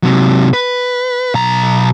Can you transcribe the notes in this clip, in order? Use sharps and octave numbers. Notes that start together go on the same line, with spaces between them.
C3 F#3
B4
B1 A#5